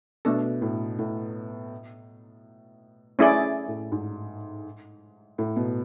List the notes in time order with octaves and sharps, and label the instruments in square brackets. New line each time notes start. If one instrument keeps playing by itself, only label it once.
[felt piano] B2 [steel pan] A3 D4 A4
[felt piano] A2
A2
[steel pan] A3 C#4 E4 G#4 D5
[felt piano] A2
G#2
A2
B2